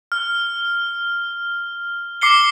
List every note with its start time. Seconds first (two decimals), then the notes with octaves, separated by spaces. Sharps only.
0.12 F6
2.21 D6 C7 C#7 G7